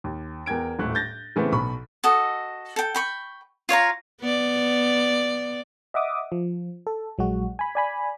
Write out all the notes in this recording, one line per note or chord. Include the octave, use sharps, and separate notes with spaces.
D#2
E2 A#4 G5 G#6 D7
D#1 A2 A3 F#6
G6 A6 A#6
C#3 E3 A3 B3 C4
B1 B2 B5 C#6
F#4 A4 D#5
A4 G5
G5 B5 C#6
F4 C#5 F5 A#5
B3 D5
D#5 E5 F#5 D6 D#6
F3
A4
A#1 F#3 G#3 F#4
G#5 B5
D5 G#5 B5